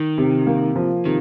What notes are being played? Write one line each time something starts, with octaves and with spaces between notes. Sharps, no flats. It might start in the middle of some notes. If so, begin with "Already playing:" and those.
Already playing: D#3
C3
A#3
F3
C3 D#3